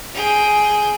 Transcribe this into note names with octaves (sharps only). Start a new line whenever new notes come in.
G#4 G5